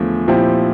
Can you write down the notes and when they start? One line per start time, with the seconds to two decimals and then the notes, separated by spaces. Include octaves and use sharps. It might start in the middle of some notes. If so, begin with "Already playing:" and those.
Already playing: E2 D3 F3 A3
0.28 A#2 F3 C4 E4 G4